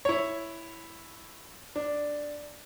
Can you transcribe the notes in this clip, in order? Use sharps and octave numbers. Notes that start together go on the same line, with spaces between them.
E4 C#5
D4